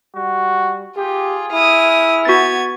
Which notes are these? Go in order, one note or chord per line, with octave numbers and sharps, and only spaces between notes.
G3 F#4
F4 G4 G#4
E4 D#6 F6
B3 F#4 G#6 A6